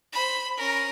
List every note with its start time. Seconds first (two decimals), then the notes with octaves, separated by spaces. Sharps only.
0.13 C5 B5
0.57 C#4 A#4